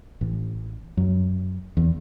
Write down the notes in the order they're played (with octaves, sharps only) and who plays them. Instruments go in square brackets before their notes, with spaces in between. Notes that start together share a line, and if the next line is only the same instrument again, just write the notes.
[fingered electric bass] A1
F#2
E2